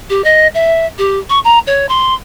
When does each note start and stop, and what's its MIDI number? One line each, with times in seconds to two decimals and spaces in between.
0.09 0.24 67
0.24 0.47 75
0.54 0.86 76
0.98 1.18 67
1.29 1.39 85
1.44 1.59 82
1.67 1.88 73
1.89 2.14 84